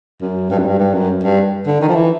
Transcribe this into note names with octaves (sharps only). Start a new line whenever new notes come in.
F#2
G2
F#2
G2
G2
F#2
G2
D3
D#3
F3
E3